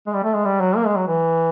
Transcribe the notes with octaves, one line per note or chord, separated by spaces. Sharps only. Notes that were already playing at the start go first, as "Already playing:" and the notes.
G#3
G3
A3
G#3
G3
F#3
A#3
G#3
F#3
E3